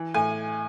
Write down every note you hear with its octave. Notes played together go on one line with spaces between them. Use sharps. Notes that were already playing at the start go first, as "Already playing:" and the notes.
Already playing: E3
A2 G#5